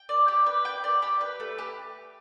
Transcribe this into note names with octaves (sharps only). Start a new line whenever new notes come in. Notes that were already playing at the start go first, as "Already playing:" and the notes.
Already playing: G5
D5
G4
B4
G5
D5
G4
B4
A3
G4